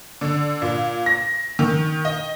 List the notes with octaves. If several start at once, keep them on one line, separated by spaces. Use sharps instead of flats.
D3
A#2
A#6
D#3
D#5